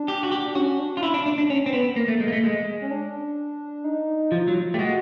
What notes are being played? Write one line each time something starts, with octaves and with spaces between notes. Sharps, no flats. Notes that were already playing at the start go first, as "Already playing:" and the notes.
Already playing: D4
G4
F#4
G4
D4
C#4 F#4
D4
F4
E4
D4
D4
D4
C#4
C4
B3
A#3
A3
G#3
A#3
A3
G#3
C#4
D4
D#4
F3 F4
F#3
A3 G4
G#3 F#4